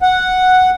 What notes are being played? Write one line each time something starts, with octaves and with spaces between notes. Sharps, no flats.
F#5